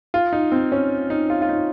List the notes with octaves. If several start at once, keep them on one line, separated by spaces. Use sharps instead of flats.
F4
D#4
C4
C#4
D#4
F4
F4
D#4